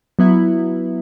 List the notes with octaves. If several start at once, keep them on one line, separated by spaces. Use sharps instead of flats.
F#3 B3 E4